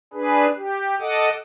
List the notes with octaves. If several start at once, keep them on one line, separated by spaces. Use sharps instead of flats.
D4 G#4 B4
G4
A4 D#5 F#5 D6 D#6